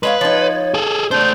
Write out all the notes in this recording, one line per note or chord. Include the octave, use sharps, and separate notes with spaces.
G#3 B4 C#5 F5
F3 D#4 C#5
G#4 A4
A3 D4 C5 G6